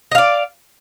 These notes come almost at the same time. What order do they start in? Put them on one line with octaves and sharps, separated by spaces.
D#5 F5 D5